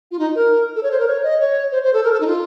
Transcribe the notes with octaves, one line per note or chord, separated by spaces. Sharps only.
F4
D#4
A#4
A4
C#5
C5
A#4
C#5
D#5
C#5
C5
C5
A4
A#4
A4
D#4
F4